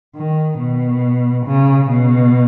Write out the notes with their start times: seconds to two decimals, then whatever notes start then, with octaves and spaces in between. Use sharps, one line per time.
0.16 D#3
0.59 B2
1.46 C#3
1.90 B2